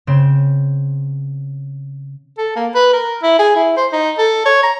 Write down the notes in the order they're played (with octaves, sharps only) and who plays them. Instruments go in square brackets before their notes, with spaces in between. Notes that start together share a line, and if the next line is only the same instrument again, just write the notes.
[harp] C#3 C4 E7
[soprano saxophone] A4
A#3
B4
A#4
E4
G#4
E4
C5
D#4
A4
C#5
A#5